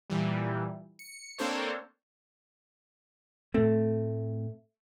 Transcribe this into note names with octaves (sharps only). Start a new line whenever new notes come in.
A#2 E3 G3
C#7
A#3 C4 D4 A4 C5 C#5
A2 A3 C4